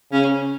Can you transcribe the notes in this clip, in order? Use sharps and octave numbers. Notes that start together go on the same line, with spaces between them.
C#3 C#4